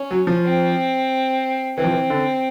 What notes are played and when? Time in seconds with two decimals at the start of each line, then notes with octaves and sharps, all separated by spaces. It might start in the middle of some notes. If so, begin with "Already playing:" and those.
Already playing: C#4
0.11 F#3
0.27 F3
0.44 C4
1.77 E3 C4
1.84 F3
1.91 E3
2.10 D3